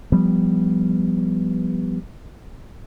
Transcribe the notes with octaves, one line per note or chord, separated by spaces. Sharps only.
F3 G3 B3